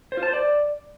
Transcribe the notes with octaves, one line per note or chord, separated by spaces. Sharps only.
C5
F4
A5
C5
D5